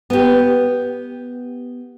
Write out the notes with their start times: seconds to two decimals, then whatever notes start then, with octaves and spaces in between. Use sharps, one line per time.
0.10 B3 G4